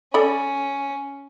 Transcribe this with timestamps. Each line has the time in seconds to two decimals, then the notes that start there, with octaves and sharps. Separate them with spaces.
0.14 C#4 A4 D5 B5